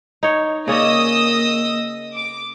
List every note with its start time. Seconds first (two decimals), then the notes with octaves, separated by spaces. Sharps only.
0.23 D#4 C#5
0.68 C#3 A#3 C#4 D5 D#5 D#6 E6
2.16 D6